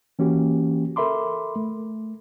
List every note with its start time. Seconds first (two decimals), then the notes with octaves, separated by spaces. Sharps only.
0.19 E3 A#3 C#4 F#4 G4
0.96 A4 A#4 E5 B5 C6 D6
1.56 A3